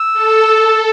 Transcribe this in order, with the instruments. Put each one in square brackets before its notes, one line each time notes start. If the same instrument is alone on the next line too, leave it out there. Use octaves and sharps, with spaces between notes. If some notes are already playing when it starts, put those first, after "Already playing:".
Already playing: [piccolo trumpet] E6
[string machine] A4